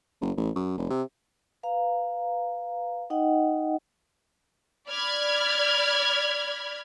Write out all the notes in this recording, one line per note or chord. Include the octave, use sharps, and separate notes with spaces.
F#1
A1
F#2
F1
C3
B4 F5 A#5
D#4 D#5 F#5 G5
D5 B5 F6 G#6